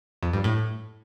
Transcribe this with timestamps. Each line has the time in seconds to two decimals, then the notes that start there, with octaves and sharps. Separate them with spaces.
0.23 F2
0.33 G2
0.44 A2